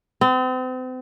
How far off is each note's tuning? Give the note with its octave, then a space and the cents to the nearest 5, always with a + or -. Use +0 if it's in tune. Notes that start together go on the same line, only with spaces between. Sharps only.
C4 -40